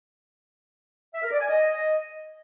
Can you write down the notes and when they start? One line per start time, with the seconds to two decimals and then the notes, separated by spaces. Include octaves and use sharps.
1.14 E5
1.23 A#4
1.32 D5
1.41 G#5
1.49 D#5